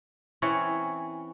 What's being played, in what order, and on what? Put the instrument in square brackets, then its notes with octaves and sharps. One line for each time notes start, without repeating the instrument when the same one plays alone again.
[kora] E3 C4 C#4 C#5